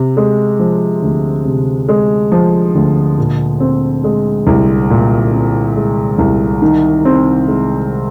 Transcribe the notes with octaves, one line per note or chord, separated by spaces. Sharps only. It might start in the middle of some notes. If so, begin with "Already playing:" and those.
Already playing: C3
G#3
F3
D2
C3
G#3
F3
D2
A#2
C4
G#3
C2
A#2
C4
G#3
C2
D#3
C4
G#3